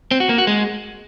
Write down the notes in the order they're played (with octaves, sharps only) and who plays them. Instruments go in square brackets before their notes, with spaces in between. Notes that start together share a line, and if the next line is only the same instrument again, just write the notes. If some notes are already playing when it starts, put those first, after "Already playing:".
[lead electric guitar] C4
F#4
A#3
F#4
G#3